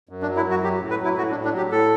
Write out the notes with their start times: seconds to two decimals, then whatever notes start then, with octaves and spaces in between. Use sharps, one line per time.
0.09 F#2
0.22 D4
0.28 F#3
0.37 E4
0.45 F#2
0.50 F#4
0.63 F#3 G4
0.81 A2
0.90 B4
0.99 F#3
1.04 E4
1.17 A2 F#4
1.31 D4
1.35 A2
1.45 D4
1.53 F#3 G4
1.71 A2 A4